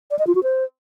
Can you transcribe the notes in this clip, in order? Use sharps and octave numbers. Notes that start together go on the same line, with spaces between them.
D5
D#5
F4
F#4
C5